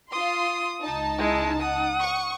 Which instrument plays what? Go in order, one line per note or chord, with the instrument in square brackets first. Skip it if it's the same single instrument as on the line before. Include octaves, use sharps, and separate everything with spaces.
[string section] F4 C6 [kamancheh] D#6
[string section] C#2 D#4 A5
[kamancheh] G#3 E4
F#5 D#6
[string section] C#6